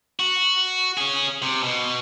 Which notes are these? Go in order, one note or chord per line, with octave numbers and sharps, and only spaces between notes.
F#4
C#4 G#4
C3
B2